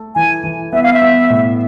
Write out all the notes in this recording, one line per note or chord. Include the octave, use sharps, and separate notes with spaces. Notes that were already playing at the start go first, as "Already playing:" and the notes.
Already playing: A3 A4
E3 G#5
E3
B3 E5
F5
E5
B3
A2